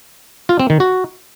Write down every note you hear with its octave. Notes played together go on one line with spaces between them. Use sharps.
F4
C4
D#3
F#4